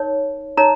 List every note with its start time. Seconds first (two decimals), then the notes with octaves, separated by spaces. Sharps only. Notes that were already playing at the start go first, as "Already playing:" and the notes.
Already playing: D#4 A#4 C#5
0.57 D#4 A#4 C#5 A#5